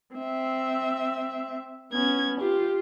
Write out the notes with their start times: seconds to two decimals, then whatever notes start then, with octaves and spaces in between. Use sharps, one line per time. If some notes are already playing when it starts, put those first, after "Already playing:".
0.16 C4 E5
1.93 B3 C#4 G#6
2.41 F4 G4